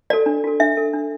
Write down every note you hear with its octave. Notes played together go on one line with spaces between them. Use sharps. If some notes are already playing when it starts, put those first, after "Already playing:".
F#4 A4 D5
D4
F#4 A4
D4 E5
A4
D4